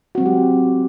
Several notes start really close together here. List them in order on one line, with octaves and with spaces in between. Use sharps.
F#4 C4 F#3 G#3 G4